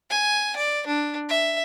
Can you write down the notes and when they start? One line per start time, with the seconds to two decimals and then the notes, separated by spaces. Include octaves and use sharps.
0.11 G#5
0.57 D5
0.87 D4
1.29 E5